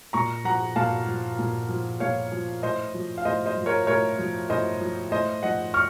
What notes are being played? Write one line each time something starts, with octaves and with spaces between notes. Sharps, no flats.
A#2 A#5 C#6
F3 F#5 A#5
A#2 F5 A5
F3
A#2
F3
A#2 C#5 F5
F3
A2 C5 D#5
F3
F5
A2 C5 D#5
C5 D#5
F3
A#4 C#5
A2 A#4 C#5
F3
A2 C5 D#5
F3
A2 C5 D#5
F3 D#5 F#5
C#6 F6